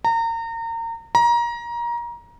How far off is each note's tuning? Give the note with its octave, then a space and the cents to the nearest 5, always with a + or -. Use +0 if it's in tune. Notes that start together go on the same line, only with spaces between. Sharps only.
A#5 -30
A#5 +25